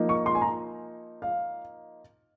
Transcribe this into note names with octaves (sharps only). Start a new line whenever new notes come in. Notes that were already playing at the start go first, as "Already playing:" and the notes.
Already playing: F3 A#3 D#4
C#6
C6
G#5
A#5
F5